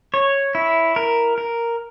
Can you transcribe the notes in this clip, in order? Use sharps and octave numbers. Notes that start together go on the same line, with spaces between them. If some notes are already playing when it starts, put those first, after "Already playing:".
C#5
E4
A#4
A#4